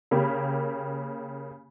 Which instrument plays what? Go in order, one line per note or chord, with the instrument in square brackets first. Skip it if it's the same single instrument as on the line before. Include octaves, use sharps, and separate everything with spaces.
[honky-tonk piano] C#3 A#3 G4 B5